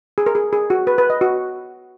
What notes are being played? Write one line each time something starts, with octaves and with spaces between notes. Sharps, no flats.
G#4
A#4
G#4
G#4
F#4
B4
B4
D#5
F#4